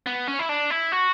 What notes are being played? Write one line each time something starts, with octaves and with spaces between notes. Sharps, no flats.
B3
C#4
E4
D4
E4
F#4